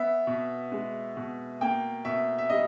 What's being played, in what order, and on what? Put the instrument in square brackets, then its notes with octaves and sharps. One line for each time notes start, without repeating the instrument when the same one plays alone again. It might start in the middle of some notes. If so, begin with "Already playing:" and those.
Already playing: [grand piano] B3 E5
B2
G#3
B2
A#3 G5
B2 E5
E5
G3 D#5